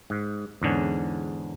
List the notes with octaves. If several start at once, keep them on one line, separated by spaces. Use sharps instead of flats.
G#2
E2 G#2 D3 C#4